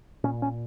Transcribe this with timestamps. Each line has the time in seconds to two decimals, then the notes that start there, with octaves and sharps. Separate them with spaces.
0.24 A#2 C#4
0.42 C#4